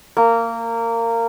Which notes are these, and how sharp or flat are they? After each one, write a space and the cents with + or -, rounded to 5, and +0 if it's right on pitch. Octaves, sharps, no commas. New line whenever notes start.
A#3 -20